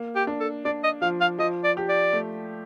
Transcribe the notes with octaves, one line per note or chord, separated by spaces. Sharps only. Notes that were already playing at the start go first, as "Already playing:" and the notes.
Already playing: A#3
G4
D4
A4
D4 D5
D#5
F3 F5
F5
F3 D#5
D5
G4
D5
A3